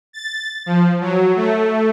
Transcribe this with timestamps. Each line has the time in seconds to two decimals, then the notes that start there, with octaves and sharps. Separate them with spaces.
0.13 A6
0.66 F3
1.01 F#3
1.36 A3